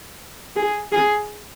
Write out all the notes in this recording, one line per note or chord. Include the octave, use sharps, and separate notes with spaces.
G#4
G#4